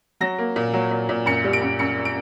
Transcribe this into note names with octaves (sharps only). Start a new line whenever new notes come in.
F#3 A#6
A#3
A#2
F#3
A#2
A#2
F#2 C#7
G3
D7
F#2
F#2 C#7
D7